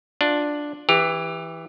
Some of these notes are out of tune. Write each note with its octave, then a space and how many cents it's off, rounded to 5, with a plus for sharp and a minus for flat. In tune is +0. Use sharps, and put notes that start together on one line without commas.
D4 +0 F4 +20 E5 +0
E3 +0 G4 +30